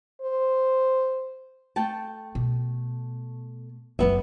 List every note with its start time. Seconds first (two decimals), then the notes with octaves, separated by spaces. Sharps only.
0.21 C5
1.76 A3 G5 A5
2.35 B2
3.99 F#1 F#2 B3 E5